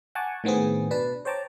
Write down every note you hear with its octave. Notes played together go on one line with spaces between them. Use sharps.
F#5 G#5 A5 C#6 D6
A2 D#3 B3 C4 G#4
B2 D4 B4 A5
C5 C#5 G5 A5 A#5 D6